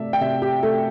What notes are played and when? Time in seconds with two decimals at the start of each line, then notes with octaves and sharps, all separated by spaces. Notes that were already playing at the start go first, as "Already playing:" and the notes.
Already playing: C3 A3 D5 E5
0.13 G5
0.21 C3 E5
0.42 G4
0.63 A3 A4